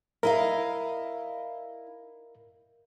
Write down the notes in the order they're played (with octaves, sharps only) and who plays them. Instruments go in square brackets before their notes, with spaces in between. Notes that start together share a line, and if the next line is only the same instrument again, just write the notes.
[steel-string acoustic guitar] E4 D#5 F5 [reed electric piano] A#4